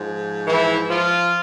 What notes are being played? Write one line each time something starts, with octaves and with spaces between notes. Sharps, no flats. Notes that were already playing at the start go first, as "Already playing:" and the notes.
Already playing: G#2 F3
E3 E4
F3 F4